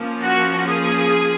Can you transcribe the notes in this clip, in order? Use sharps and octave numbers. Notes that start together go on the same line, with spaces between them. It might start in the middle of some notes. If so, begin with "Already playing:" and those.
Already playing: F3 A#3 C#4
F#4
G#4